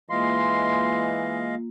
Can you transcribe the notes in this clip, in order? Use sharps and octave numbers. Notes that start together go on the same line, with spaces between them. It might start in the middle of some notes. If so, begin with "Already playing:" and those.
E3 G#3 A#3 F4 D#5 F5 C6